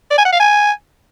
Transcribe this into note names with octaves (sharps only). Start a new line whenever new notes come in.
D5
G#5
F#5
F5
G#5